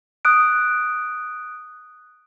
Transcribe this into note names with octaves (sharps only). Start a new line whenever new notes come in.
D#6 F#6 D7